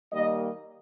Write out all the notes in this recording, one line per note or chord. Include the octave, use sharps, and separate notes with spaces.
D#3 G3 A#3 D#5